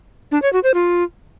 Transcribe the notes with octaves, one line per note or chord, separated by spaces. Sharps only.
D4
C#5
F#4
C5
F4